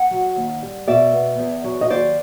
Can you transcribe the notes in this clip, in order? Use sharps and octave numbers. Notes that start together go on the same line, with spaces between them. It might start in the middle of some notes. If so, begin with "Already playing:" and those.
Already playing: F#5
F#3
D#2
G3
B2 D5 E5
B3
E2
F#3
D#5
D#2 C5 D5